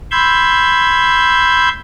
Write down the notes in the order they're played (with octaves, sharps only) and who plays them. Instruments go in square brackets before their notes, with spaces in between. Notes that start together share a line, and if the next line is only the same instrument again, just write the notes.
[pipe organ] B5 C6 E6 G6 G#6